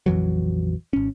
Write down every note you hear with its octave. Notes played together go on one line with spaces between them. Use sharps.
A#1 F2 E3 F#3
G#1 C#4